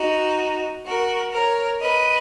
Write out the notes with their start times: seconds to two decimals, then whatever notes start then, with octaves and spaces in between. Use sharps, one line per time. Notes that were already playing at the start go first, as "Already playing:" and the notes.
Already playing: D#4 F#4
0.86 F#4 A#4
1.33 A#4 C#5
1.80 B4 D#5